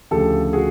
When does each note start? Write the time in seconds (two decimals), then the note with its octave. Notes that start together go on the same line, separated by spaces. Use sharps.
0.11 D2 C#3 F3 G4 A4
0.53 F#4 G#4